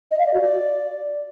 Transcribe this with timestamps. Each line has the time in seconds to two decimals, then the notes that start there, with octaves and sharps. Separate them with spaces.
0.11 D#5
0.19 F5
0.26 D5
0.34 F#4
0.41 D5